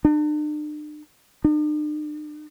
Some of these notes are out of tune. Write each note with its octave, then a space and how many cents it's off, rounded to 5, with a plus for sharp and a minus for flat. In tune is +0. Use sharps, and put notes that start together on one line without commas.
D4 +45
D4 +45